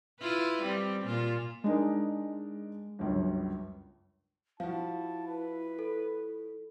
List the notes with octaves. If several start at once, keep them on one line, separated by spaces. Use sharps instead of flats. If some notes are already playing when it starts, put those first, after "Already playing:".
E4 F4 B4
G3 C4
A#2 F4
G#3 D4 D#4 A#4
G1 C#2 F#2
F3 E4 F#4 F5 A5
B4
A4